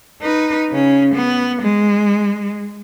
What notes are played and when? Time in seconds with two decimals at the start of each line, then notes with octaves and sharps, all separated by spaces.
0.22 D#4 B4
0.70 C#3 C#4
1.15 B3
1.62 G#3